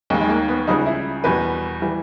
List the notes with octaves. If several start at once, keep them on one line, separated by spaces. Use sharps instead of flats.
D#2 D#3 G3 G#3
G#3
A#3
B3
C#2 C#3 G3 D#4
E4
E2 B2 G3 B4
E3 G3